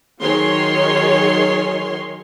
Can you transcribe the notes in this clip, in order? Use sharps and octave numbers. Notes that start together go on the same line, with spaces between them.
D#3 F#3 G#4 C#5 C6